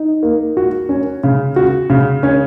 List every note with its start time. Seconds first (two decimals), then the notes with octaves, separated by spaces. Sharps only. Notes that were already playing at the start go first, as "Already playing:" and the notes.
Already playing: D#4
0.23 A#3
0.57 F#4
0.89 C#4
1.24 C#3
1.56 F#4
1.90 C#3
2.23 C#4